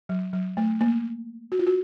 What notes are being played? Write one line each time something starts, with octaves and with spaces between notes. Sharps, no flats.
F#3
F#3
A3
A#3
F#4
F4
F#4